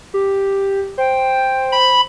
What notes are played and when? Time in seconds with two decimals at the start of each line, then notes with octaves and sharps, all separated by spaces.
0.14 G4
0.98 C5 G5
1.72 B5